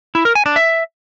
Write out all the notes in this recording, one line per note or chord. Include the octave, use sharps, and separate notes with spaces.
E4
A#4
G#5
D4
E5